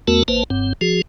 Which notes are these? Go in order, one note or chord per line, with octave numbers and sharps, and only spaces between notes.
E2 A3 B3 F#4 A#4 A5
A1 A#3 B4 C5 A5
F#1 G2 C4
F3 F#4 G#4